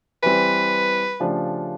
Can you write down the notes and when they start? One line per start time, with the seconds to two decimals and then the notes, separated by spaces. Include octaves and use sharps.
0.23 E3 G3 C4 B4
1.20 C#3 F3 A3 D4 G4